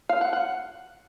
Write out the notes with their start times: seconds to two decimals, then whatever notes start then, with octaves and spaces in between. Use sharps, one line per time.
0.09 F5
0.21 F#5
0.33 F#5